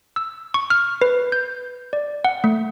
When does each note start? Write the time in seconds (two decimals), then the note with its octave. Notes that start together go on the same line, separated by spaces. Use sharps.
0.16 E6
0.54 C#6
0.70 F6
1.01 B4
1.32 G6
1.93 D5
2.25 F#5
2.44 A3